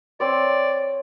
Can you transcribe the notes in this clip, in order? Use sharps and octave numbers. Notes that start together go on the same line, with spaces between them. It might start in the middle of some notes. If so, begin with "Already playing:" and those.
C4 C#5 D5